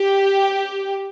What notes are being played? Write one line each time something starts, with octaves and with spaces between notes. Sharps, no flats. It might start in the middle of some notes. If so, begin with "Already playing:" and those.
Already playing: G4